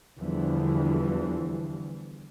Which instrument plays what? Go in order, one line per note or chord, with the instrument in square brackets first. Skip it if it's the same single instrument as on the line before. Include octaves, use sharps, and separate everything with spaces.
[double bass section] E2 D3 E3 F3 G3